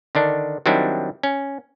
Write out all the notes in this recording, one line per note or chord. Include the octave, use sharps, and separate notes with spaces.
D3 D#3 D4
D#3 F#3 G3 C4 D4 E4
C#4